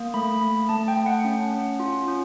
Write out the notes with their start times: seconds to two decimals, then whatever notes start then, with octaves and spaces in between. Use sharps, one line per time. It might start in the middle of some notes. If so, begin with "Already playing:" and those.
Already playing: A#3
0.14 A3 B5
0.41 A3
0.69 A3 A5
0.88 G5
0.97 A3
1.06 F#5
1.25 C#4
1.52 C#4
1.80 F4
2.08 C#4